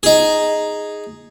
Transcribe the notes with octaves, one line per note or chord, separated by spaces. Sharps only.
D#4 G#4